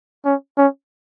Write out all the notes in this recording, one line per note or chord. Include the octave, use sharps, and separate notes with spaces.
C#4
C#4